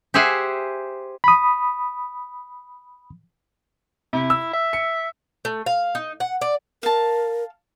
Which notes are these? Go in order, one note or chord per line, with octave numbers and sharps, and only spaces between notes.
G4 G#4 C5 E5 F#5 G#5
B5 D#6
C3 E4
E6
E5
C#7
A3
F5
D#4
F#5
D5
A#4 F5 A5